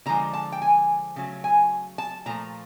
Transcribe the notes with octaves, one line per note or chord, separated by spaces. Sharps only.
D3 F3 G#3 A#5
A5
G5
G#5
C#3 F#3 A3
G#5
A5
A#2 F3 A3 A#5